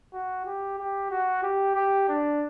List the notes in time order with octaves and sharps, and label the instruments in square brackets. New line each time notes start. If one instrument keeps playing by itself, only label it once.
[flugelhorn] F#4
G4
G4
F#4
G4
G4
D4